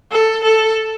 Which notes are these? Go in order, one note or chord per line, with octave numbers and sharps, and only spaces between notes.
A4
A4